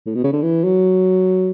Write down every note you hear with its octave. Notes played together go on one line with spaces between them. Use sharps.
A2
B2
C#3
D3
E3
F#3